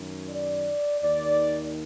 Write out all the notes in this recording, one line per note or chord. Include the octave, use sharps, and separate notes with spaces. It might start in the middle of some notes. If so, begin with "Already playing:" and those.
Already playing: F#2 D#3
D5
D#2 D#3 D5